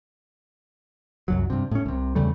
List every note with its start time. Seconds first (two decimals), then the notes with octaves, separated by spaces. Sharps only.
1.28 C2 F#2 F#3
1.50 G2 C3
1.71 A2 C#4
1.86 C2 C3
2.15 E2 C#3 G3 A3